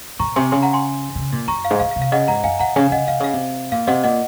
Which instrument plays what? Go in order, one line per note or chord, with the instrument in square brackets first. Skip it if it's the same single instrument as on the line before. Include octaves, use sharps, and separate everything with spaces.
[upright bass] A#2 [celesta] A#5 C#6
[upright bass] C3 [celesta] G#5 C6
[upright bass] C#3 [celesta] G#5 C6
[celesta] F#5 A#5
G#5 C6
[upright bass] C#3
A#2
[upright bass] F#2 [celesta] A#5 C#6
[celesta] F5
[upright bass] G#2
[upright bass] A#2 [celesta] F5
[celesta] F5
[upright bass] C3
[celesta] F5
[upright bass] C#3 [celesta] D#5 F#5
[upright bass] G#2 [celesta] F#5 A#5
[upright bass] F#2 [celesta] F5 G#5
[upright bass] A#2 [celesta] F#5 A#5
[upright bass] C#3 [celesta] F5 G#5
[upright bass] C#3 [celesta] D#5 F#5
[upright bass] C3 [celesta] F5
[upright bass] C#3 [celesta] F5
[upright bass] C3
[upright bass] A#2 [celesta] F5
[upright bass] C3 [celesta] D#5 F#5
[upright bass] A#2 [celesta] D#5 F#5